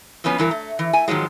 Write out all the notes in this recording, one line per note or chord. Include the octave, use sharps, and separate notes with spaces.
F2 A2 F3 B3 C#4
G2 E3 A#4
A3
E3
A3 G#5
G#2 D#3 F3 F#3 G#3